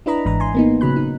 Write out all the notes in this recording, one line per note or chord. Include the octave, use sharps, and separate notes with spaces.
D4 E4 B4 D#5 A#5 B5
G#1 G#2 E3 A#5
G#5 C6
A#3 B3 D#4
A#1 C#3 F#3 B5 F#6
D#4